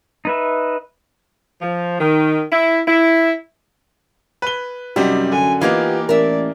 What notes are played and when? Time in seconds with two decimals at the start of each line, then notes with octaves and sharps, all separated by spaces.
0.25 D#4 B4 E5
1.61 F3
2.00 D#3
2.52 E4
2.88 E4
4.42 B4 G7
4.96 F#2 C3 G3 D#4 F#4
5.32 D3 G#5
5.61 E3 A#3 B3 D#4 F4 G4 F5
6.09 A1 A#4 D5 E5